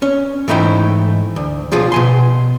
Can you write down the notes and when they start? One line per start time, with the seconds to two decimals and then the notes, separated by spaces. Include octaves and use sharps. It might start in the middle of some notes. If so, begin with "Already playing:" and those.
0.02 C#4
0.48 G#2 E3 A3 D#4 E4 G5
1.36 D2
1.72 B1 F3 F4 G#4
1.92 B2 G#5 C6